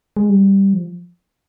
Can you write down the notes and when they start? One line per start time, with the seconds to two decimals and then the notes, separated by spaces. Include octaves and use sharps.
0.17 G#3
0.29 G3
0.73 F3